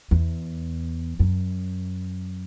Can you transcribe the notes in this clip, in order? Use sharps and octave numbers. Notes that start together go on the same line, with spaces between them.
E2
F#2